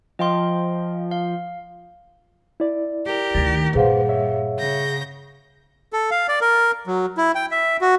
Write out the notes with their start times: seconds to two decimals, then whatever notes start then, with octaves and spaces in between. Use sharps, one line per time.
0.19 F3 D#5 G5 C6
1.11 F5
2.60 E4 D5
3.05 G4 A#4
3.34 D2 D#3 A6 A#6
3.75 G2 A#2 G#4 B4 C5 F5 F#5
4.09 C#5 E5
4.57 C#3 G6 A#6
5.93 A4
6.11 F5
6.29 D5
6.41 A#4
6.87 F#3
7.17 E4
7.35 G5
7.51 E5
7.81 F#4